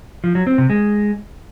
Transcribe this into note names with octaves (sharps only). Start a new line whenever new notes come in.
F3
F#3
C4
C3
G#3